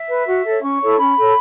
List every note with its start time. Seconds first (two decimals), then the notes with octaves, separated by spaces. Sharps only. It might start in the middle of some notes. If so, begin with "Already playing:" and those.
Already playing: E5
0.09 B4
0.27 F#4
0.45 A4 C#5
0.62 C#4 C#6
0.80 E4 A4 C#5
0.98 C#4 B5
1.17 A4 C#5